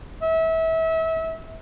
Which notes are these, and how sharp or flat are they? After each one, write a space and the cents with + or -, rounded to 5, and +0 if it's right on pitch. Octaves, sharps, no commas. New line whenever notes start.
E5 -30